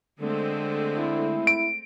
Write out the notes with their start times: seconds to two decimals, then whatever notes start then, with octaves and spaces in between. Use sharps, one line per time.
0.20 D3 G#3 A3 C4
0.98 E4
1.47 D7